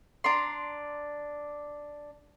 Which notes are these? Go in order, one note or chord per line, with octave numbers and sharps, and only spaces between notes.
D4 A#5 C6